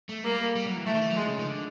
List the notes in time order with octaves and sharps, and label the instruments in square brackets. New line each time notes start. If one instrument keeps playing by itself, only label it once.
[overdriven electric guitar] A3
[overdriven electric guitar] G3 [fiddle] A#3
[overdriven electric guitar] G3
F#3
E3
[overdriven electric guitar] E3 [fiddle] A3
[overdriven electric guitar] D#3
E3
F#3
[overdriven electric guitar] F3 [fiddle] G#3
[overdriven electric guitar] C#3
D#3
D3